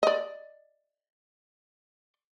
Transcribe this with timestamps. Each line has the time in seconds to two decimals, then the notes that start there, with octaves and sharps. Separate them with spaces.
0.03 D5 D#5